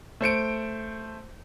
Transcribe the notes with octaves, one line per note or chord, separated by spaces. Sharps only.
A3 C5 C#7 D7